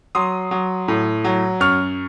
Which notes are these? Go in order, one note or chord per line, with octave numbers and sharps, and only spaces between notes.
F#3 C6 D#6
F#3
A2
F#3
F#2 C#6 F6